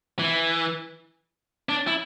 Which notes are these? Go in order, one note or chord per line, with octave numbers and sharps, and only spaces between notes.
E3
D4
E4